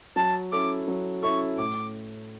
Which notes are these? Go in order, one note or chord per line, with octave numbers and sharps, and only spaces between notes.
F#3 A5
C#4 E4 A4 D6
F#3
C#4 E4 A4 C#6
A2 D6